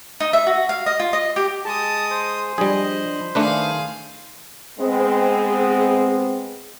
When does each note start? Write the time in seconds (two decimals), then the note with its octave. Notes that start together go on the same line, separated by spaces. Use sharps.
0.20 D#4
0.33 E5
0.47 F#4
0.69 F5
0.86 D#5
0.99 F4
1.13 D#5
1.36 G4
1.65 G#3 G#4 A5 D#6
2.11 C5
2.58 F3 G3 D4 G#4 D#5 B5
3.35 D#3 A3 D4 G#4 B4 F5
4.80 G#3 B3 C4 G#4